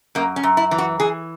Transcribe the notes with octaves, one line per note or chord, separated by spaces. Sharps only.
F#2 A#3
C#4
F#2
E4
E3
F#4
E3 G#4